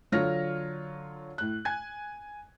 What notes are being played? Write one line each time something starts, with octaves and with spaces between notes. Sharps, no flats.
D3 F#3 F4 C#5 F6 A#6
A2 F#6
G#5 G#6